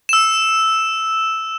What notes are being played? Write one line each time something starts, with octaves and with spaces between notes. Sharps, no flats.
E6 E7